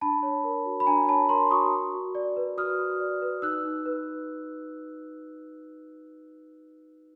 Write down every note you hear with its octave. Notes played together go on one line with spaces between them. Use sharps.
D4 A5 B5
C#5
A#4
F#4
B5
D4 G#5 A#5
C#5 A5 B5
A#4 A#5 C6
F#4 C#6 D#6
F#4
F#4
D5
B4
F#4 D#6 F6
F#4
D5
B4
D#4 E6 F#6
D#4
B4